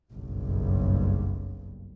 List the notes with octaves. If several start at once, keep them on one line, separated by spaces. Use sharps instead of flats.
F#1 B1 G2